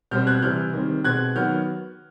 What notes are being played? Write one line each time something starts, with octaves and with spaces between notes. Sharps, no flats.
B2 G3 C4 F6 G6
F#6 G#6
C3 E3 G3 F6 G6
D#3 G3 C4
B2 G#3 C4 F#6 G#6
D#3 F#3 B3 F6 G6